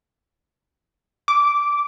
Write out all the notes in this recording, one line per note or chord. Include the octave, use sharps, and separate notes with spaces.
D6